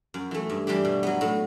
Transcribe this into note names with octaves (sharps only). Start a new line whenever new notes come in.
F#2
E3 A3
G2
E3 G3 D4 G4
B2
F#3 B3
A2